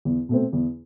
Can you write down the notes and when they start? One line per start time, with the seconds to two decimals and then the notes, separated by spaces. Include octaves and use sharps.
0.05 E2
0.29 B2 A3 C4
0.53 E2